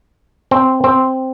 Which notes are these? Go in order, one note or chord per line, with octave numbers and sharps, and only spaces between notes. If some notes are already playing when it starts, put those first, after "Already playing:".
C4
C4